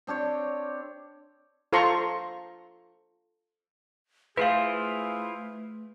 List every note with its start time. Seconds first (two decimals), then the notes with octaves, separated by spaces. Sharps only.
0.07 C4 D4 G4 C#5
1.73 F4 A4 C5 A#5 C6 C#6
4.37 A3 E4 F4 G#4 B4 C5 F5